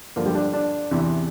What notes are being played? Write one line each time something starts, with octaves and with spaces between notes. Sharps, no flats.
G2 D3 F3 A#3
G3
D4
D4
E2 C3 E3